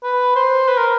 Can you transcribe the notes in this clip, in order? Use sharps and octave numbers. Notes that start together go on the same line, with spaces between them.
B4
C5
B4
A#4